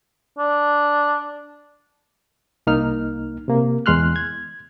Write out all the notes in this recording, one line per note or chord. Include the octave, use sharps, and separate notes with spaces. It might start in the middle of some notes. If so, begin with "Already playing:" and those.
D4
C2 A#3 D#4 F6
C3 A#3
E2 G#3 C6 F6 F#6
G#6